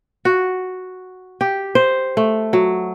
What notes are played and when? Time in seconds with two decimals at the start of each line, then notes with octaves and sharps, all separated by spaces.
0.25 F#4
1.41 G4
1.75 C5
2.17 A3
2.53 F#3